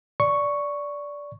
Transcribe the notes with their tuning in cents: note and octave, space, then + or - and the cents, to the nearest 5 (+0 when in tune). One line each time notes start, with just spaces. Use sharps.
D5 -15 C#6 +0